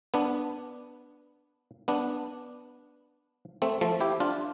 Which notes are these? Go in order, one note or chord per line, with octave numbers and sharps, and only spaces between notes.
B3 D4
B3 D4
A3 C4
F3 A3
E4 G4
D4 F4